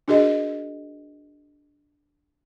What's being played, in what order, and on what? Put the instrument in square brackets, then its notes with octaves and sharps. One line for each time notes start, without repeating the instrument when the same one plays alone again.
[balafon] D4 F#4 G#4 A#4 D#5